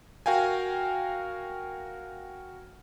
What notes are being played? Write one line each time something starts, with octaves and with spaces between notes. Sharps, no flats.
F#4 A#4 F5 G5 G#5